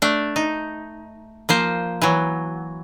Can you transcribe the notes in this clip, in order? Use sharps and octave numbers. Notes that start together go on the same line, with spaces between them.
A3 D4
D#4
F3 A#3 C5
E3 F#3